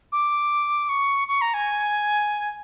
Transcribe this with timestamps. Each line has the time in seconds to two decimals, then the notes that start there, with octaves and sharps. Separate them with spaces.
0.12 D6
0.89 C#6
1.28 C#6
1.41 A#5
1.54 G#5